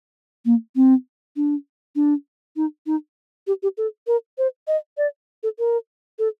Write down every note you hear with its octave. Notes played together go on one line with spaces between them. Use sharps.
A#3
C4
D4
D4
D#4
D#4
G4
G4
A4
A#4
C5
D#5
D5
A4
A#4
A4